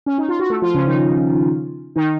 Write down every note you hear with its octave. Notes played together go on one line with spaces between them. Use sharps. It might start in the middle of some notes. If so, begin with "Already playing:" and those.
C#4
D#4
F4
F#4
A3 A4
F3 F4
C#3 C#4
D#3 D#4
D#3 D#4